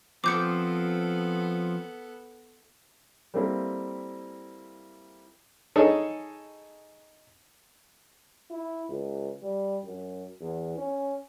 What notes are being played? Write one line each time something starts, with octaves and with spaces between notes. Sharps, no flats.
F3 B3 C4 A4 D6 G6 C#7
G3 A#3 C4 E4 A4
D#4 G#4 A4 C#5
E4
C#2
G3
F#2
E2
C#4